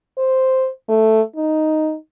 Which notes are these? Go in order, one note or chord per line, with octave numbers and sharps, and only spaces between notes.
C5
A3
D#4